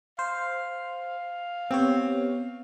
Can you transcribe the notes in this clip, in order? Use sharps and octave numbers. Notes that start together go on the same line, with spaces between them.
C5 F5
B3 C4 G4 C#5